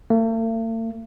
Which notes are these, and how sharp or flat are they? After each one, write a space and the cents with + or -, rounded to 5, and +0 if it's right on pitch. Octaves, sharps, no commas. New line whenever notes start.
A3 +45